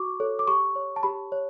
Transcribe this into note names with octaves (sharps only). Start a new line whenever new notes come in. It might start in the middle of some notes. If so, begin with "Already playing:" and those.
Already playing: F#4 C#6 D6
A4 C#5
D6
G4 C#6
C#5
A5
G4 B5
C#5